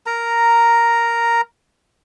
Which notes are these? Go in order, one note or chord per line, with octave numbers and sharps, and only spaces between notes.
A#4 A#5